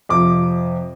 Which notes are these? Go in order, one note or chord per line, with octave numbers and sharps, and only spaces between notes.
F2 C3 F3 D6